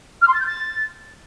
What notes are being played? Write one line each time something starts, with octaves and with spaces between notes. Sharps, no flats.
F6
C6
A6
G6
A6